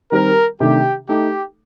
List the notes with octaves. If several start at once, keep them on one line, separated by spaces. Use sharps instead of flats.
D#3 G3 C4 G4 A#4
C3 D#3 A3 D4 G4
A3 D#4 G4 A4